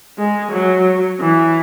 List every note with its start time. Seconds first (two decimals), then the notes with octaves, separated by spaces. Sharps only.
0.19 G#3
0.52 F#3
1.21 E3